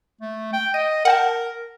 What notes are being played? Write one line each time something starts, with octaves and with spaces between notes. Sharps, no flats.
A3
G5
D#5 D#7
A#4 F#5 G5 A5